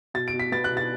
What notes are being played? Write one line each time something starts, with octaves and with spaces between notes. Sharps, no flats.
B2 A6
D7
B2
B6
B3 A6
F#6
B2
A6